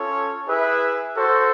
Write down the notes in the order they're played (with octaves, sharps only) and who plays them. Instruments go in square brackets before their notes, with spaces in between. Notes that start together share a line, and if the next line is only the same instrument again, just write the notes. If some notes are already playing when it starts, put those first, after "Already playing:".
Already playing: [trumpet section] C#4 F4 A4 C#5
E4 G#4 B4 E5
F#4 A4 C5